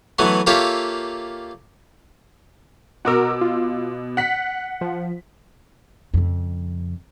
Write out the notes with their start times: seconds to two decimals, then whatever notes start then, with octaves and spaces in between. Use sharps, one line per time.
0.19 E3 F#3 A3 B3
0.47 A#3 F4 G4 A4 C#5 E5
3.05 B2 F#4 A#4 D6 E6
3.41 F4
4.17 F#5 F#6 B6
4.81 F3
6.14 F2 C#3